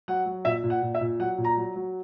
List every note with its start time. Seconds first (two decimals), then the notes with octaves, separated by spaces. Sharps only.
0.08 F#3 F#5
0.26 F#3
0.45 A#2 E5
0.64 A#2
0.70 F#5
0.82 A#2
0.95 E5
1.01 A#2
1.20 F#3 F#5
1.38 A#2
1.45 A#5
1.57 F#3
1.76 F#3